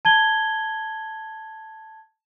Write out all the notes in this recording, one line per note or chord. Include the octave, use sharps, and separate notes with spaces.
A5 G#6 G7